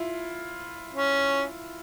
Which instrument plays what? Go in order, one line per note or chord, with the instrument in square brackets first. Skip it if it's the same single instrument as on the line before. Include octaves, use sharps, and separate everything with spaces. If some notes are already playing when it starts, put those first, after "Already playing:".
Already playing: [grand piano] E4 F4
[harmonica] C#4